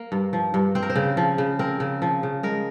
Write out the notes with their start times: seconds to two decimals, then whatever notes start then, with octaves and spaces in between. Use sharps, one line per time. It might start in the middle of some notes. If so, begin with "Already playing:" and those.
Already playing: A#3
0.12 G2
0.33 F3
0.54 G2
0.75 C4 C5
0.83 A#4
0.90 C5
0.96 C#3
1.17 F3
1.38 C#3
1.59 C4 A#4
1.80 C#3
2.02 F3
2.23 C#3
2.43 G#3 A#4